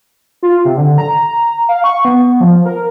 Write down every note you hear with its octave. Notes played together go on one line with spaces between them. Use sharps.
F4
C3
D3
A#5
F5
C#6
B3
F3
A#4